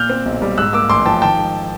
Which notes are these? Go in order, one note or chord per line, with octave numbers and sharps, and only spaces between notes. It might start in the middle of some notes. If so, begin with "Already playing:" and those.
Already playing: A#2 F6 G6
C4
B1
G3
G#2 E6 F#6
A#3 D6 E6
A1 C6 D6
F3 G5 A5
D#3 G5 A5
G#2